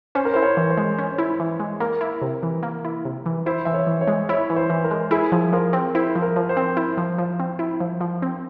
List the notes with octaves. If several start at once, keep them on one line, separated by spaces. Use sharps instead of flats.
C#4 C5
A#4
E4 C5
C#5
E3
C5
G#3
C#4
E4
E3
G#3
A#3 A#4
E4
C3
E3
A#3
E4
C3
E3
E4 C5
E3 E5
C#5
E3
C#5
G#3
E4 C#5
E3
C5
E3
A#4
G#3
E4 G#4
F3
F3 A#4
C4
E4 C5
F3
A#4
F3
C5
C4
E4
F3
F3
C4
E4
F3
F3
C4